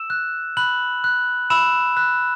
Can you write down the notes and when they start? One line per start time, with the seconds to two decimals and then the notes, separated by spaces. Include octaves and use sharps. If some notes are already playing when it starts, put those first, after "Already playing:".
Already playing: E6 E7
0.10 F#6
0.57 B5 F#6 F#7
1.04 F#6
1.50 B5 E6 E7
1.97 F#6